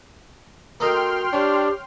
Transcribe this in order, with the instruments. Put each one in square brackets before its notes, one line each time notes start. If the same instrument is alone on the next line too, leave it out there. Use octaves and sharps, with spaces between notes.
[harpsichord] A#3 A4 D#5 [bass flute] F#4 [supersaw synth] G5 C6 F6
[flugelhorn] D4 [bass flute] G4 [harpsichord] C#5